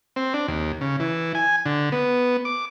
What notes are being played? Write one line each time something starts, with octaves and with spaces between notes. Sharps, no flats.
C4
D4
D#2
C#3
E3
G#5
D3
B3
D6